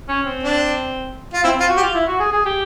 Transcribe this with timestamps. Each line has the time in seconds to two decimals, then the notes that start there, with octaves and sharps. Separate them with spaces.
0.08 C#4
0.26 C4
0.43 D4
1.34 F4
1.44 C4 E4
1.57 C4 F4
1.69 F#4
1.77 G4
1.82 F4
1.94 E4
2.07 F#4
2.19 G#4
2.32 G#4
2.45 G4